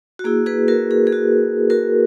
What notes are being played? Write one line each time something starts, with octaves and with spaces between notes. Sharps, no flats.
F#4
A#3 E4 G#4
G#4 B4
F#4 A#4
G#4
G#4
F#4
F#4 A#4